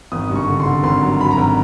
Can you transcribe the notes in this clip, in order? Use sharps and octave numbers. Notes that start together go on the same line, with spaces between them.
G#1 D#6
G2
C#6
D3
C6
D3
G#1 C6
F#3
F#3 B5
A#5
G#1